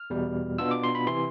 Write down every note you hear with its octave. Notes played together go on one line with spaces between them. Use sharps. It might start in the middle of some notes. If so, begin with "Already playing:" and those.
Already playing: F6
E2 B2 G3
B2 B3 D4 F4 E6
D6
C6
B5
C3 E3 C6